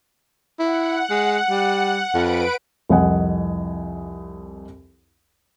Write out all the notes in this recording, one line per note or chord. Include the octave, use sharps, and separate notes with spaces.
E4 F#5
G#3
G3
F2 B4 D7
C2 F2 D#5 F#5 G#5